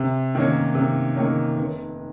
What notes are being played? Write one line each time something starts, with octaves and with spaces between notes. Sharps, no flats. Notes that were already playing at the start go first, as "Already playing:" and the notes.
Already playing: C3
D#3 A#3 C#4
C3
D#3 A#3 C#4
F1